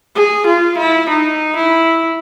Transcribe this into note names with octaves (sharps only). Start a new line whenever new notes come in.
G#4
F4
E4
D#4
E4